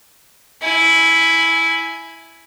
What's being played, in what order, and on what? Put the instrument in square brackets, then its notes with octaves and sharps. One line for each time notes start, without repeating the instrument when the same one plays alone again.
[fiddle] E4 G#5